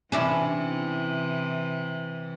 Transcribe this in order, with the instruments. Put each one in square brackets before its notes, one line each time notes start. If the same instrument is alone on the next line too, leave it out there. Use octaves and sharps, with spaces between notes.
[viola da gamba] C3 E3 [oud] C#4 D4 E4